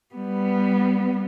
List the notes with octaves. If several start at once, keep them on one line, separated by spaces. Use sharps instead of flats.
G3 B3